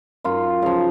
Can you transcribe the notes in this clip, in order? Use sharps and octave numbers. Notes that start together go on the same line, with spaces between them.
F#2 F4
C#3 F3